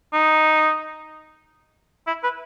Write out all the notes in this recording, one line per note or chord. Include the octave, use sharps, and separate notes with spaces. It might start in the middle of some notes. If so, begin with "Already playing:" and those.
D#4
E4
B4